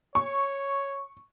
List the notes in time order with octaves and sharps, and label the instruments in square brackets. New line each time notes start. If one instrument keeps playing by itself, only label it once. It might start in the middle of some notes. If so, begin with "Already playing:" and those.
[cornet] C#5 [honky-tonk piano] C#6